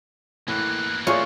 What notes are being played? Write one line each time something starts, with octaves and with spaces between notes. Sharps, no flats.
A2 E3 A#3 F#6
A3 F4 G#4 C#5 D5